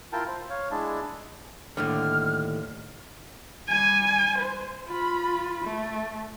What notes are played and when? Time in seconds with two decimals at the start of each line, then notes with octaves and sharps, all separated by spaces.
0.13 E4 F4 A#4 G5 A5
0.28 C5
0.50 C#5 F5
0.71 G#3 D4 E4 A5
1.77 D#2 A2 D3 F6
3.68 G3 G#5
4.38 C5
4.87 F4 B5
5.64 A3